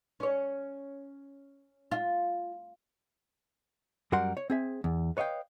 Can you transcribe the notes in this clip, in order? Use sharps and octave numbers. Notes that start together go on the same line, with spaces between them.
C#4 C#5
F4
F#2 G3 F#4 A#4 F#5 C6
C#5
C4 G#4 E5
E2
B4 C#5 D#5 F5 G5